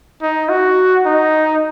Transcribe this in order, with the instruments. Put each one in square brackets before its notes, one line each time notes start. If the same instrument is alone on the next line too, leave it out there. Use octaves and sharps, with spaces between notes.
[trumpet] D#4
F#4
D#4